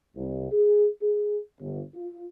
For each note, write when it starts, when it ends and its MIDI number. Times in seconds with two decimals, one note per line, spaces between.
0.16 0.50 36
0.52 0.87 68
1.02 1.38 68
1.61 1.82 31
1.94 2.24 65